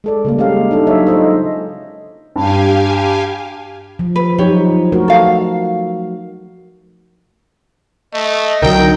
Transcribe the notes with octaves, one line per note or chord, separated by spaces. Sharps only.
G#3 A4 D5
C#3 G3 A#3
G#3 C#4 G4 F5
D4 D#4 A4
F#3 C#5 E5
D#4 F4 A4 C5 D#5
G2 G4 F5 G#5
F3
B4
F3 F#3 D#4 G4 C#5
A3 F#4 A#4
A4 F5
A3 D#5
C2 D3 F#3 D#4 A#4 G5